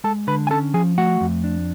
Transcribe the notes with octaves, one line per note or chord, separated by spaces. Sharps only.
G#3 A4 A5
D3 B4 B5
G#5
C#4 A4 A5
F3 G#4 G#5
A3 F#4 F#5
F2
D4